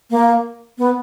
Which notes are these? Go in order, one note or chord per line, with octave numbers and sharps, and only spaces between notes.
A#3
B3